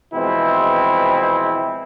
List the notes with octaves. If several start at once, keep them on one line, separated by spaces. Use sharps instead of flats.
B2 E3 F3 G#3 C4 E4